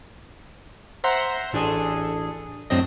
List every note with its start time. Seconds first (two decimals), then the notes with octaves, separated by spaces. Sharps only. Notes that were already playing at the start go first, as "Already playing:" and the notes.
1.04 C5 E5 F#5 A#5 C6
1.53 A1 D4 G#4 A4
2.70 F#2 A2 F#3 C4 D4 D#5